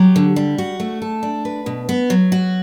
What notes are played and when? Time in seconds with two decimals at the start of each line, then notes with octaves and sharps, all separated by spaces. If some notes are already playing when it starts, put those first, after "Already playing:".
Already playing: F#3 G4
0.16 D3
0.36 G3
0.58 F#4
0.80 A3
1.02 A4
1.23 D4
1.45 B4
1.66 B2
1.89 B3
2.10 F#3
2.32 F#4